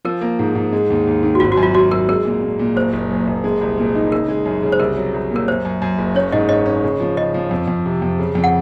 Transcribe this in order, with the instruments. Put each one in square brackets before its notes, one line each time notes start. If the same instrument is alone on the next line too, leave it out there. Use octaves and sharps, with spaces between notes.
[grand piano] F3 [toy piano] A#4
[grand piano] A#3
G#2
G#2
G#3
D#2
D#2
D#3
[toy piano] F#4
[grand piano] G#1 [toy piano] F4
[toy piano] F#4
[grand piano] F#2
[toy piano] F4
[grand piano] F#2 [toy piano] F#4
[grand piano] F#2 [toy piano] A#4
[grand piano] G#3 [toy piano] A#4
[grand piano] A#2
A#2
A#2
[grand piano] F#1 [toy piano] C5
[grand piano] F#1
F#2
F#1
G#3
C2
A#2
D#4
[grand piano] C#3 [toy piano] A#4
[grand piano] G#3
F#2
C#3
[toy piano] C5
[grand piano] C2 [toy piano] A#4
[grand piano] F#3
C2
[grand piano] A#2 [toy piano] A#4
[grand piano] F#2 [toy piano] C5
[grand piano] F#2
F#2
F#1
[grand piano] C#4 [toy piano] C#5
[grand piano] G#2 [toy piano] D#5
[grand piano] C#4 [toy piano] D#5
[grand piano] C#4
C#3
F3
[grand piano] C#3 [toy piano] D#5
[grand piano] F3
F2
F2
C3
F2
C#3
F2
[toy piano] F#5